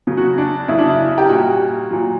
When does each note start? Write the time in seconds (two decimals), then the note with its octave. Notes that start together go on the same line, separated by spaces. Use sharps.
0.07 C#3 F#3
0.17 F#4
0.38 D4
0.68 C#3 F#3 E4
0.79 D4
0.89 E4
1.18 G4
1.29 A#2 G3 F#4
1.91 A#2 F#3